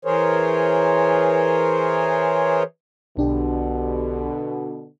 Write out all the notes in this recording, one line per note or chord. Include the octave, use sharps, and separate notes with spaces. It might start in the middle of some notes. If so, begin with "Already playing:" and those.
E3 G#4 A#4 C5 C#5
B1 B2 D3 D4 G4